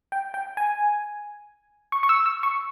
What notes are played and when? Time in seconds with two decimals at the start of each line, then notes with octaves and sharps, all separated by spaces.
0.12 G5
0.34 G5
0.57 G#5
1.92 C#6
2.03 C#6
2.09 E6
2.26 E6
2.43 C#6